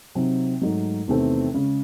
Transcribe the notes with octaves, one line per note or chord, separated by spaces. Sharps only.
C3 F#3 C4 D#4
G#2 F#3 A3 D#4
E2 C3 D#3 A3 C4
C#3 G#3 C#4